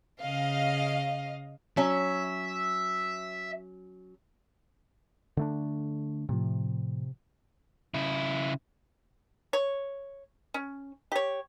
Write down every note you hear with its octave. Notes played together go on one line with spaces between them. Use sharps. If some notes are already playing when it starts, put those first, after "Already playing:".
C#3 D#5 F5
F#3 C#4 E5
D3 A3 D4
A2 C3 F3
C#3 E4
C#5
C#4
G4 C#5